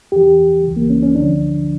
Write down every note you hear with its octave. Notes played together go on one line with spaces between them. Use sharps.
E2 E3 G4
C#2 C#3 E3
A#3
C#4
C#4
D2 D3 F3 D4